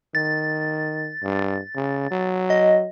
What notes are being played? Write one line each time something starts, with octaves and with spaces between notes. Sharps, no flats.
D#3 A6
G2
C#3
F#3
D#5